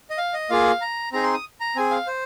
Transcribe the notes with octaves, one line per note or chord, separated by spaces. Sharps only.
D#5
F5
D#5
A#3 F4 G#4 F5
A#5
C4 D#4 G#4 A#5
C6
D#6
A#5
C4 G#4 G#5
F5
C5